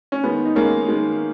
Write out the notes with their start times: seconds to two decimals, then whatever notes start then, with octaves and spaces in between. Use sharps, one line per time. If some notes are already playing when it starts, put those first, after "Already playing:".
0.12 C#4
0.24 D#3 G#3 B3
0.45 D#4
0.56 D#3 G#3 A#3 C#4
0.88 D#3 G#3